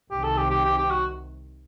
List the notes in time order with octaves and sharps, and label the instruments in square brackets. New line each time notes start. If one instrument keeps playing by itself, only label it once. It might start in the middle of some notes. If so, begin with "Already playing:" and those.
[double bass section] C2 C3 D#3 [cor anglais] G4
[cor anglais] A4
G4
G4
G4
G4
F#4